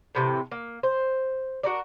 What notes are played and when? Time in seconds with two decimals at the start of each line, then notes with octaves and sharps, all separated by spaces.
0.15 A2 C3 E3
0.52 A#3
0.83 C5
1.63 D4 F#4 A#4 D5